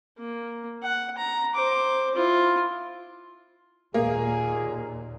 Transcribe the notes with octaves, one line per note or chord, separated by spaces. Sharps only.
A#3
F#5
A#5
C5 D6
E4 F4
D#2 A#2 A#3 G#4